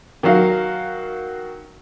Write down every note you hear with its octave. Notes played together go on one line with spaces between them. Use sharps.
D#3 F#3 F#4 F5